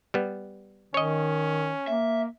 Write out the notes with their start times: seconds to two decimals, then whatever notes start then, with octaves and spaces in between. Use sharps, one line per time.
0.14 G3 B3
0.94 D#3 C#4 C#5 D#5
1.88 A#3 E5